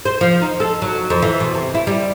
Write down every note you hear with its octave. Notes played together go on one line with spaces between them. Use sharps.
C5
F3
D#4
A4
F#3
F2
E3
B2
C3
E4
G3